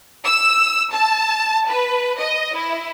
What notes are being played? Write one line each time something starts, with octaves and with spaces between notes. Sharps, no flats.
E6
A5
B4
D#5
E4